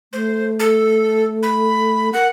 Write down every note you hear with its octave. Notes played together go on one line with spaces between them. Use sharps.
A3 C5
A4
B5
A#4 F#5